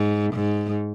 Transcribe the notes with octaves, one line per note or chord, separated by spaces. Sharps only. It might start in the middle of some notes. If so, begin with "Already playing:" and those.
Already playing: G#2
G#2